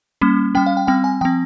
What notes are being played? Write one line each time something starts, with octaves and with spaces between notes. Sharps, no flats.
G3 A#3 C#4
G3 C#4 G5
F5
G5
G3 C4 G5
G#5
F3 C4 G5